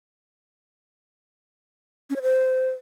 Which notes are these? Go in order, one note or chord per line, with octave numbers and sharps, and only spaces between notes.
C#4
C#5
C5